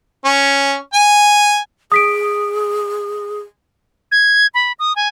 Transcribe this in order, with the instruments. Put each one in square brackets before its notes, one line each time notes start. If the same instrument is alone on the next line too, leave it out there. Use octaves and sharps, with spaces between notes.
[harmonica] C#4
G#5
[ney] G#4 [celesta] D#6 B6 D7
[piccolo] G#6
B5
D#6
G#5